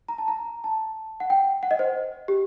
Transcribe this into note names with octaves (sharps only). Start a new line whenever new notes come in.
A#5
A5
A#5
A5
F#5
G5
F#5
D#5
C5
G4